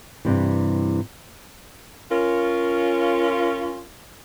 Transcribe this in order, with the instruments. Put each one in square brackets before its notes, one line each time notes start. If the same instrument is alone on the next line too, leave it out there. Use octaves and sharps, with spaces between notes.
[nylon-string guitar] G2 C3 E3
[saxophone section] C#4 F4 [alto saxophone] A#4